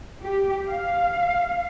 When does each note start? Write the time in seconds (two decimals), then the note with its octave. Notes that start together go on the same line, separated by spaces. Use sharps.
0.22 G4
0.68 F5